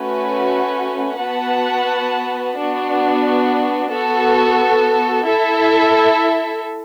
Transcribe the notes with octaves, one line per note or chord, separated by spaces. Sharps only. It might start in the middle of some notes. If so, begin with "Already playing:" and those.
Already playing: A3 C#4 F#4 B4
B3 F#4 B4 F#5 A5
B3 D4 F#4
B3 F#4 A4
E4 A4 E5